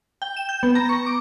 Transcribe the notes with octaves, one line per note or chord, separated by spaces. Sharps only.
G5
E7
G6
B3
A#5
C#6
D6